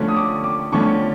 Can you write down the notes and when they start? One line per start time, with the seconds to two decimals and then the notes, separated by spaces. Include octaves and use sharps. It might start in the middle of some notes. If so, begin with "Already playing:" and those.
Already playing: D3 F3 A3 C#4
0.08 D#6
0.16 D6
0.44 D6
0.72 D3 F3 A3 C#4 C#6